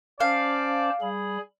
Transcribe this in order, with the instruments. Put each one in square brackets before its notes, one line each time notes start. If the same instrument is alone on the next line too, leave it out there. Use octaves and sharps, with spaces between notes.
[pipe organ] C#4 C5 A5 [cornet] D5 [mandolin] F5
[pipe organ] G3 B5 [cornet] G#4